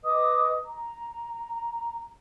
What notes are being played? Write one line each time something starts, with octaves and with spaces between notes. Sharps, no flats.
B4 D#5 D6 D#6
A#5